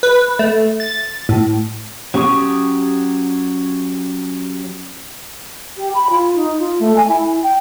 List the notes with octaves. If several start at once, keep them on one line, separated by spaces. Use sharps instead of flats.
B4
A3
A6
A2
F#3 C#4 G4 C#6 D#6
G4
B5
F4
D#4
F4
A3
G#5
E4
G5